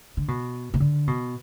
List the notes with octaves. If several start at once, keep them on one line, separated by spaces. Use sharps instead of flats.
D3
B2
B2
D3
B2